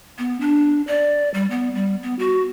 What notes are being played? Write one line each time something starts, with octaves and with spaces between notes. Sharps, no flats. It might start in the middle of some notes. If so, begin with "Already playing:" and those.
B3
D4
D5
G3
B3
G3
B3
F#4